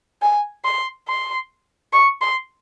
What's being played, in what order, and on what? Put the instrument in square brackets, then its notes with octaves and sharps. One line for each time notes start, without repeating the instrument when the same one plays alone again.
[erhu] G#5
C6
C6
C#6
C6